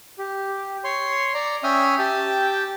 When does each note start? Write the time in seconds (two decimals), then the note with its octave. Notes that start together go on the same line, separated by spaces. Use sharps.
0.18 G4
0.84 C#5 C6
1.34 D5 A#5
1.64 C#4 E5 G5 D#6 F6
1.99 G4 G5 A5